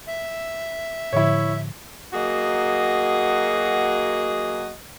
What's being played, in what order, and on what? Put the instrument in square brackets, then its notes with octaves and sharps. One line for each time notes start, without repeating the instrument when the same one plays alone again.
[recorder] E5
[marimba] A2 D3 F3 [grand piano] E4 C#5
[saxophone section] F#3 A#3 F#4 G#4 D#5